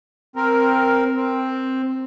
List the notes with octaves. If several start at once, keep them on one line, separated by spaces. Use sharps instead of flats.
C4 A#4
C4